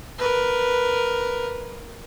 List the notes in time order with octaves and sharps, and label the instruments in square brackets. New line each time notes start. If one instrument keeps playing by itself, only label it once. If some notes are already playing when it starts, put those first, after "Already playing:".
[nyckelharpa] A#4 B4